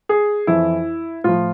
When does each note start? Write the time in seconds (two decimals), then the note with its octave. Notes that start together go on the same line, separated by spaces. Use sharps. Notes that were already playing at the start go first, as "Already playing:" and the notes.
0.09 G#4
0.47 F2 E3 E4
1.24 A2 F3 F4